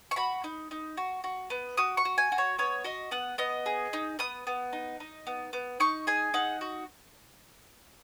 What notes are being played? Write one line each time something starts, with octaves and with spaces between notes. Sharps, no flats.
C#6
F#4 B5
D#4
D#4
F#4
F#4
B3
F#4 D#6
C#6
F#4
G#5
F#4
C#5
B3 C#5
F#4 D#5
B3 F#5
B3 D#5
G#4
D#4
B3 D#6
B3
D#4
D#4
B3
B3
D#4 C#6
G#4 G#5
D#4 F#5
F#4